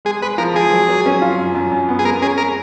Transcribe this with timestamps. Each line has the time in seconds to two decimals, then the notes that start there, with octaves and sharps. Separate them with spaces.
0.05 G#3 G#4
0.22 G#3 B4
0.38 F3 A#4
0.55 F3 G#4
0.72 F#3
0.89 F#3
1.06 C#4
1.21 F4
1.38 F#2
1.55 F#2
1.71 F#2
1.89 B3
1.99 G#4
2.05 G#3 A#4
2.22 C#4 G#4
2.38 A#4